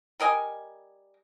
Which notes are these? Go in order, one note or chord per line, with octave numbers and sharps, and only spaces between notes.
G3 A#4 D#5 G#5